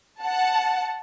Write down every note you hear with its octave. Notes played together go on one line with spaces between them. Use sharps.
F#5 A5